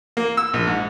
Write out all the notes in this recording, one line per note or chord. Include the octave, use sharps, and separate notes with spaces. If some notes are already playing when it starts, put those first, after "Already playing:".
A#3
E6
A#1
G#2